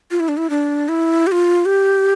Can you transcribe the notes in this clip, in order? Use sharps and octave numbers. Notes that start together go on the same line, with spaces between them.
F4
E4
D4
E4
D4
E4
G4
F4
G4